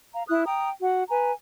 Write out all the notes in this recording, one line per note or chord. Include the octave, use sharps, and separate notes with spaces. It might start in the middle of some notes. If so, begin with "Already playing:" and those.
F5 A#5
E4 D#6 F#6
G5 A#5 D#6
F#4 F#5
B4 G#5 A#5